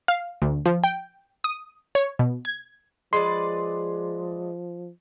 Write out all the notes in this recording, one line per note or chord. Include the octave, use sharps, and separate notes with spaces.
F5
D2
F3
G5
D#6
C#5
B2
G#6
F3 G#3 B4 D5 C6